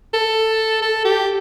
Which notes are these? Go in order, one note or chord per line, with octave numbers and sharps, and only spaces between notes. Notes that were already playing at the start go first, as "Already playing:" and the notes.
A4
A4
G4